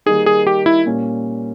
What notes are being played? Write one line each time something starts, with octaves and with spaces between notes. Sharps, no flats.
D#3 G3 A#3 D#4 G#4
G#4
G4
E4
A#2 G3 A#3 C#4